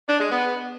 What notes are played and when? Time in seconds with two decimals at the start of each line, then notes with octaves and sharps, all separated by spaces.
0.08 D4
0.20 G#3
0.31 B3